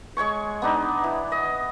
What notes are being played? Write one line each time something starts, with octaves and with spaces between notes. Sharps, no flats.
G#3 C#5 G#5 C#6
B3 D4 D#4
E3
D#5